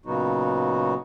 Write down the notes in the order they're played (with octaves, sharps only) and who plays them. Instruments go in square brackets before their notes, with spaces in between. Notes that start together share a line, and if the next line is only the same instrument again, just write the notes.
[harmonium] A#2 C#3 F#3 B3 D#4 F#4